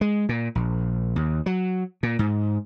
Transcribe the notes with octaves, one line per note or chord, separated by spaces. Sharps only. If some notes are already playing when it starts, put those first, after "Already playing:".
G#3
A#2
A#1
D#2
F#3
A#2
G#2